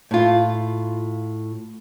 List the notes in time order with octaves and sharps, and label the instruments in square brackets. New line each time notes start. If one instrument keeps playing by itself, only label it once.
[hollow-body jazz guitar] A2 F4